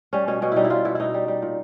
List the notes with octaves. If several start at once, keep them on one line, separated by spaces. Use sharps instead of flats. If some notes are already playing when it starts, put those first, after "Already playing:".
G3 C#4
B2 C#4
B2 C#4
G3 D#4 E4
E4
G3 F4
B2 E4
B2 D#4 E4
G3
G3
A#2